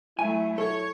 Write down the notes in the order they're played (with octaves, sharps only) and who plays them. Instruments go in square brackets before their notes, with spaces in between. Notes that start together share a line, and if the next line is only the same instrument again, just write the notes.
[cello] F#3 A3 [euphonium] E4 [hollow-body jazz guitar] G#5
[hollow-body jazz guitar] A4 [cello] C#5